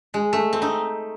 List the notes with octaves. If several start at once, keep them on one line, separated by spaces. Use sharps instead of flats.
G#3
A3
C4
D#4